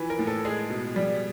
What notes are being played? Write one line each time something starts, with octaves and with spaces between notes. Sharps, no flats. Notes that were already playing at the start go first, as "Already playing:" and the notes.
Already playing: E3 F3 B4
A#4
A2
A4
G#3 G#4
B2
G3